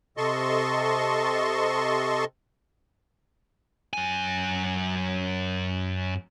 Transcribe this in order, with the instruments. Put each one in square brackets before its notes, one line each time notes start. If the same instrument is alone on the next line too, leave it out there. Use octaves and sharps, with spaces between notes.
[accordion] C3 A4 D#5 A5 C6 C#6
[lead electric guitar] F#2 G#5